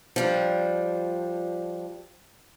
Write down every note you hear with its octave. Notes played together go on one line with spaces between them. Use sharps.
F3 G3 D4